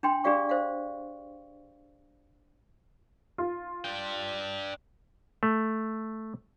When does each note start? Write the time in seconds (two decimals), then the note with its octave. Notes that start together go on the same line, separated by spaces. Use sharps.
0.03 D4 G5 C6
0.24 D4 G4 G#4 D5 F5 C#6
0.49 C5 F5
3.38 F4
3.85 D4 G5
5.43 A3